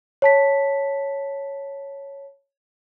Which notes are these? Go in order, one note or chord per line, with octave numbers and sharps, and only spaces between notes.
C#5 A5 B6